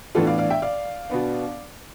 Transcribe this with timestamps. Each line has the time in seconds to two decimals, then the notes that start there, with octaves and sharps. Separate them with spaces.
0.15 A2 E3 B3 D4 F4 A4
0.27 D5 F5
0.38 D5 F5
0.50 E5 G5
0.62 D5 F5
1.10 B2 B3 D4